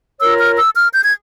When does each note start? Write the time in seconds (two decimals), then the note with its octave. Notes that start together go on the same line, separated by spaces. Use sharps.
0.20 F4 A#4 C#5 E6
0.38 F6
0.56 E6
0.75 F6
0.94 G6
1.05 G#6